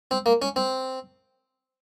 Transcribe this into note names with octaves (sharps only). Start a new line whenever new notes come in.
C4
A#3
C#4
C4